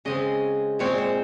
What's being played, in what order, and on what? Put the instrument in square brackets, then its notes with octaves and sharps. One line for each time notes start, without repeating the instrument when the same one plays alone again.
[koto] C#3 G#3 C4 D#5
A#2 G#3 C4 C#5
C5